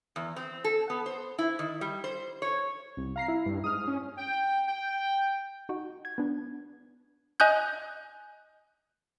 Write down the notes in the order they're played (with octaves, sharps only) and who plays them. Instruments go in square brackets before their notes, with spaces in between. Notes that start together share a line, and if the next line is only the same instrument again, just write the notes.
[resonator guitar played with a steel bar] E2
C4
A4
B3
C5
E4
D#3
G3
C5
C#5
[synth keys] C2
F5 A#5 C7
E4
[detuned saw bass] G2
[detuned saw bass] G#2 [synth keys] D#6 F6
[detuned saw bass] C#4
[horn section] G5
G5
[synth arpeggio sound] D#4 F#4
G#6
B3 D4
[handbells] D#5 G#5 D#6 F#6 G6